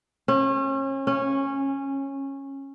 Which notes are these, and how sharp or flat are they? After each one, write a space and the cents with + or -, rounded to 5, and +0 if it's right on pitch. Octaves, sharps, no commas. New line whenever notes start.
C#4 -35
C#4 -15